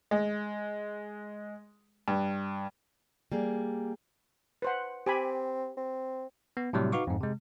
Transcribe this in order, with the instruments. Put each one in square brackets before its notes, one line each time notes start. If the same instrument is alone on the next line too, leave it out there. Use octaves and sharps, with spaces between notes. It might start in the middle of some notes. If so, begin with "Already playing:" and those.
[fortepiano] G#3
G2
[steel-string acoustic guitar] G3 A#3 G#4
[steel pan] B4 C5 F#5
[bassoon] C4 [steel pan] G4 G#5 B5
[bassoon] C4
[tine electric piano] B3
A2 C3 F#3 G3
D#4 F#4 B4 F5 C#6 D6
F2 G#2
C3 G#3